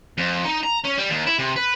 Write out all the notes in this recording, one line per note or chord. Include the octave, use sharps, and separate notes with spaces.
F2
D#4
A#5
C#4
G3
D#2
E4
C3
B4